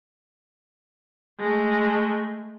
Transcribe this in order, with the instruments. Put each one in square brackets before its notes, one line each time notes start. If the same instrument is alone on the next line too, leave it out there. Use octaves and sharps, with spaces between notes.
[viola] G#3 A3